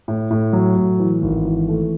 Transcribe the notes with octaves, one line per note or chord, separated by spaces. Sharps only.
A2
A2
F#3
A2
E3
G#1
E3
A3